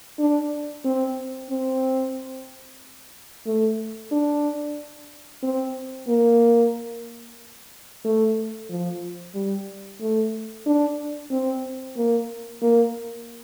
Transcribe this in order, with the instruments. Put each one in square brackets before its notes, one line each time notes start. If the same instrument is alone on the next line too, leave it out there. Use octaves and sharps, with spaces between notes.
[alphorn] D4
C4
C4
A3
D4
C4
A#3
A3
F3
G3
A3
D4
C4
A#3
A#3